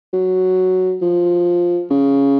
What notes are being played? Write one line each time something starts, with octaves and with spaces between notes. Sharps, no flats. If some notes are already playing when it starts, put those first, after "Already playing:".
F#3
F3
C#3